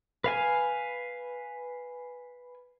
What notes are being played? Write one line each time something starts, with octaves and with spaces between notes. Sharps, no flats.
B4 F5 G#5